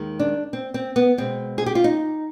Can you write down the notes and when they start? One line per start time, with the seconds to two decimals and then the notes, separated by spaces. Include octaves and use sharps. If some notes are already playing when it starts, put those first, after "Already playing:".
Already playing: D#2 D#3 G#3
0.20 D4
0.53 C4
0.74 C4
0.96 B3
1.18 B2 G#3 C4
1.58 G#4
1.66 G4
1.75 F4
1.84 D#4